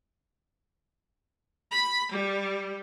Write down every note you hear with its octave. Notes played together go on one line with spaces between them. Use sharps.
B5
G3